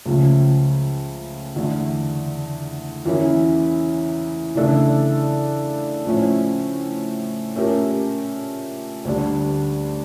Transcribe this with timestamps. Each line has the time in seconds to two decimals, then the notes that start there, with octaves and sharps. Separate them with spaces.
0.06 C#2 C#3 F3 A3
1.56 E2 D3 A3
3.06 E2 E3 A#3 C#4 E4
4.55 C#3 E3 A3 D4 A4
6.05 A2 F3 A3 C#4
7.55 A#2 A3 C#4 G4 A#4
9.05 D2 D3 G3 D4